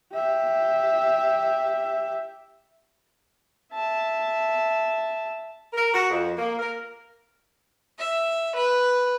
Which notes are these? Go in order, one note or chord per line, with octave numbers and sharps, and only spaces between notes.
G4 E5
E5 A5
A#4
F#4
F2
A#3
A#4
E5
B4